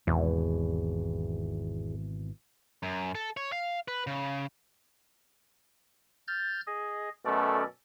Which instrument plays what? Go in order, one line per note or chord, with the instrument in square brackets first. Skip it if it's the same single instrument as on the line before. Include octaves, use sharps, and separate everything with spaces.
[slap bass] G#1 B2 E3 [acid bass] E2
[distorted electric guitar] F#2
A4
C#5
F5
B4
C#3
[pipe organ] F6 G6 A6
G#4 D#5
[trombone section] F#2 B2 A3 [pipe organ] C#4 A4 D5